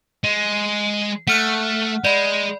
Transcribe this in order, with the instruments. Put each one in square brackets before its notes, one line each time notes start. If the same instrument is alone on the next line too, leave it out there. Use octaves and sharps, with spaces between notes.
[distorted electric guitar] G#3
[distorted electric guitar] A3 [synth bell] F#5 F6 F#6
[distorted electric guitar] G#3 [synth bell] D5 B5